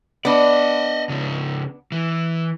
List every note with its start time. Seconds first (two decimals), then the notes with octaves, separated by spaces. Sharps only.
0.25 B3 D4 D5 D#5
1.09 C#3 F3
1.92 E3